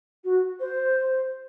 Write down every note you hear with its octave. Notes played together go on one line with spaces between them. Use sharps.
F#4
C5